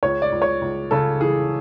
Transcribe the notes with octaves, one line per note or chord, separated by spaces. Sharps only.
C#2 C#5
D5
C#2
C#5
C#2
C#3 A4
E3 G#4